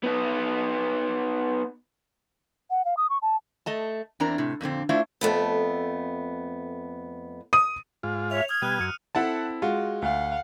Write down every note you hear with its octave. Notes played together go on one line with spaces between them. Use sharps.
B3 D#4
F#5
F5
D#6
C#6
A5
A3 D#5 A5
E2 C4 D4 E4 A#4 A#5
A2 C3
F2 A#2 D3 C4
A3 D4 E4 F4 C5 E5
F2 A3 B3
D#6 D#7
G#2 F4
C#5 E5 F7
D#6 F6 G#6
B2 G3 F6 F#6 D#7
F#2 C#7 D#7
C4 E4 A4 E5 F#5 A5
G#3 F4 F#4
D2 F5 F#5